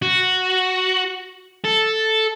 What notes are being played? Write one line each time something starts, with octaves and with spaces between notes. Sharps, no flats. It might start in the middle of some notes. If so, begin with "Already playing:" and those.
F#4
A4